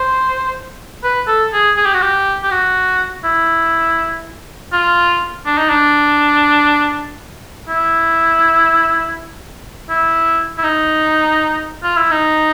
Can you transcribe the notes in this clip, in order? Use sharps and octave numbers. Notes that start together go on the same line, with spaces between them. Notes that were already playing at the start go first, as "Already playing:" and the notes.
Already playing: C5
B4
A4
G#4
G#4
G4
F#4
G4
G4
F#4
E4
F4
D4
D#4
D4
E4
E4
E4
D#4
F4
E4
D#4